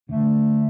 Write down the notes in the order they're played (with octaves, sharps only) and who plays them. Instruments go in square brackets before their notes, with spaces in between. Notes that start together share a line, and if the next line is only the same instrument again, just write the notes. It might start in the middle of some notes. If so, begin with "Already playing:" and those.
[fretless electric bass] D3 [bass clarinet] A3